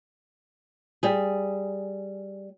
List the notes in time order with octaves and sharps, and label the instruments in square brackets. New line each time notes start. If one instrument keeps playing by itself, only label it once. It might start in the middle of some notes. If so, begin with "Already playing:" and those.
[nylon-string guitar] G3 G#4